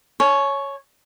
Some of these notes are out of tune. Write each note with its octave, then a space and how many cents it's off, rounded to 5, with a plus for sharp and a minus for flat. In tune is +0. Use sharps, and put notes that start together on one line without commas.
C#5 +0 G#5 +45